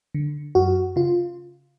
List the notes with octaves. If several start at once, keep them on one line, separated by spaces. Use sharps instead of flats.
D3
F#2 F#4
C#3 F4